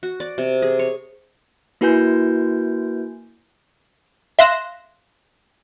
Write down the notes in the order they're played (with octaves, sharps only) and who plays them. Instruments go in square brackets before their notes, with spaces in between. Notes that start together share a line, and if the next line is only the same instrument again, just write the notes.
[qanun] F#4
D5
C3
G#4
C#5
[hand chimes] A#3 E4 F#4 B4 G#5 G6
[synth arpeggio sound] E5 F5 C6 F#6 A#6 E7